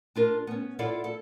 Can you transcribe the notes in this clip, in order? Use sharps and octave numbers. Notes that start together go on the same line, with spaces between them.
D4 F4 A#4
B3 C#4
E4 F4 A4 D5 F5 F#5
A4